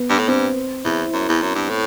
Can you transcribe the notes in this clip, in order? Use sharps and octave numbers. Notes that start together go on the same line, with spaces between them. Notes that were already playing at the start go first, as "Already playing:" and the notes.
Already playing: B3
G2
A2
G2 C4
E2 E4
F#2
E2
F#2
G2
A2